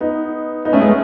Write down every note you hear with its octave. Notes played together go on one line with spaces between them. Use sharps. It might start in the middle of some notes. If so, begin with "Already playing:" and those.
B3 D#4
B3 D#4
A3 C#4
G#3 B3
A3